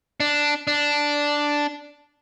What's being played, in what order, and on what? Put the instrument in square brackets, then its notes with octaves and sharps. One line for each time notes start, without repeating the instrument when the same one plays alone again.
[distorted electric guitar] D4
D4